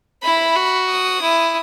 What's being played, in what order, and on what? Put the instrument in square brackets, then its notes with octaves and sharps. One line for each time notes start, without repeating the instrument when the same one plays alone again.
[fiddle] E4 [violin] B5
[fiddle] F#4
[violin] D#6
[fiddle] E4